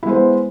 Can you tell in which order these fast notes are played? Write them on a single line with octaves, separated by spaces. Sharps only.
E4 G#3 C5 B3